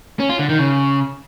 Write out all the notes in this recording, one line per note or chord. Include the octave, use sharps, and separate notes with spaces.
C#4
F4
D3
D#3
C#3